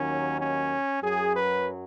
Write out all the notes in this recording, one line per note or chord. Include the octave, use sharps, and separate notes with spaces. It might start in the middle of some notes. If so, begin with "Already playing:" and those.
Already playing: D#2 D#3 F#3 C#4
C#4
F#2 F#3 G#4
B4